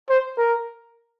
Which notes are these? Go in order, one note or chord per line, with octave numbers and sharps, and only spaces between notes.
C5
A#4